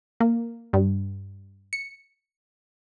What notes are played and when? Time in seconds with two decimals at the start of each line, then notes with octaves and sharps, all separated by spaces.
0.20 A#3
0.73 G2
1.73 C#7